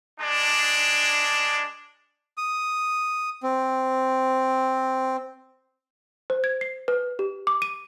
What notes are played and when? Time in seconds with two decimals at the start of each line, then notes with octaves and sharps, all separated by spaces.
0.20 G#3 D4
2.37 D#6
3.43 C4
6.30 C5
6.44 G#6
6.61 C7
6.88 B4
7.19 G4
7.47 D6
7.62 D#7